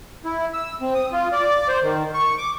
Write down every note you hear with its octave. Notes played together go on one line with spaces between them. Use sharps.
E4
E6
C4
D#6
F4
D5
C5
D#3
C#6
D6